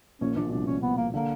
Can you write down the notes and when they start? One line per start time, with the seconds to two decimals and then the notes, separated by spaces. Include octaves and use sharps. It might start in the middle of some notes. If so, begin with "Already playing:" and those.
0.21 A#1 A#2 C#4
0.36 A#1 A#2 D4
0.46 B2
0.51 C2 C3 D4
0.66 C#4
0.82 B3
0.97 A#3
1.13 D3 A#3